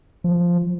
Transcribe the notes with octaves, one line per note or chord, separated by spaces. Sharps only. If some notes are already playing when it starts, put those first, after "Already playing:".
F3